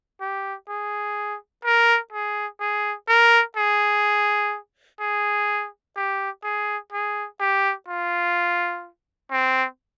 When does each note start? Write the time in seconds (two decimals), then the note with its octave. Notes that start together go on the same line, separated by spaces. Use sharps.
0.21 G4
0.68 G#4
1.65 A#4
2.13 G#4
2.61 G#4
3.08 A#4
3.57 G#4
5.00 G#4
5.96 G4
6.44 G#4
6.93 G#4
7.40 G4
7.88 F4
9.32 C4